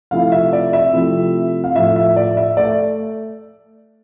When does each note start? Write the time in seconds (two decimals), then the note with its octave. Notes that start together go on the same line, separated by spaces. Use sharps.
0.11 C3 F3 A3 E4 F5
0.32 E5
0.53 D5
0.73 E5
0.93 C3 F3 A3 E4
1.64 F5
1.75 A2 F3 A3 E5
1.96 E5
2.16 D5
2.37 E5
2.57 A3 D5